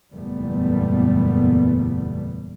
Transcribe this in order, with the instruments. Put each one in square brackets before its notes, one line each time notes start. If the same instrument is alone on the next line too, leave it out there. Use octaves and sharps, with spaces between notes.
[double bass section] F#1 E2 A#2 G3 A3 B3